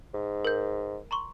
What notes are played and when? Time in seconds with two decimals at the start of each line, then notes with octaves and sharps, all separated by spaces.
0.14 G#2
0.45 A#4 G6
1.11 A#5 C6 C#6